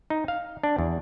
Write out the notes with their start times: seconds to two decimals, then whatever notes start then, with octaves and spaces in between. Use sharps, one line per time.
0.10 D#4
0.28 F5
0.63 D4
0.78 E2